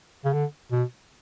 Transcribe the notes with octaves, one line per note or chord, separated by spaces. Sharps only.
C#3
D3
B2